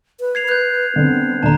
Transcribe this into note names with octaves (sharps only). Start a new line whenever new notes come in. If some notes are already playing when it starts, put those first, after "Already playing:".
B4
G#6 C7 F7
B4 F#6 G6
D3 B3 C4
D#1 D3 A5 A#5